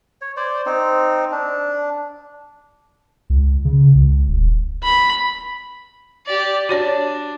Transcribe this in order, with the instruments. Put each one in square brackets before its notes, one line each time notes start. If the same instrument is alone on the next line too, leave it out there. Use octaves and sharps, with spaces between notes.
[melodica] C#5
C5 D5
C4 D#4
D4
[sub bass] C#2
C#3
C#2
D#1
[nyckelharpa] B5
[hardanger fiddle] G4 D5
[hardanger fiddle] D4 [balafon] F#4 C#5 D5